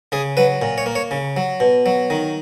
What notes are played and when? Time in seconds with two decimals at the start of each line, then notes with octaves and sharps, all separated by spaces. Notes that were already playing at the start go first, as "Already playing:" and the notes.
0.12 C#3 G#4
0.37 F#3 B4
0.62 A#2
0.78 C#5
0.86 A#3
0.95 C#5
1.11 C#3
1.37 F#3
1.60 B2
1.86 F#3
2.10 D#3